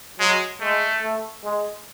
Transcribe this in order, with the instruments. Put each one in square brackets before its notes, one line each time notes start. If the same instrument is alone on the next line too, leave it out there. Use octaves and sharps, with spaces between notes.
[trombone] F#3 [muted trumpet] G#3
[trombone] G#3 [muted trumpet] A3
[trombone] A3
G#3